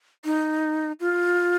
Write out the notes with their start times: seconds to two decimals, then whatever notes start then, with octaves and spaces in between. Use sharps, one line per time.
0.25 D#4
1.00 F4